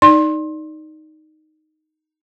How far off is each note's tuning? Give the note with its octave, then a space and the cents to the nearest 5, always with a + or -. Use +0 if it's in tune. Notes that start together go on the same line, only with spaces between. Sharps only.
D#4 +0 D5 +0 C6 +25